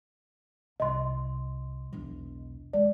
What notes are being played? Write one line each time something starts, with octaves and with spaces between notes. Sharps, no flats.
C2 D#5 C6
E1 B1
G#3 D5